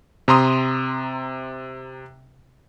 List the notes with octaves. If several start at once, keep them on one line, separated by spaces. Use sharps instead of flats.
C3 A#5 C6 D#6